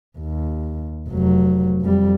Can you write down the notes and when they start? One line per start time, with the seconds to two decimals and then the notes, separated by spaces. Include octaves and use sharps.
0.19 D#2
1.09 F1 F#3
1.82 F2 G3